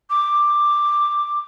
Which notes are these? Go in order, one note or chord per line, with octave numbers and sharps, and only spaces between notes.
D6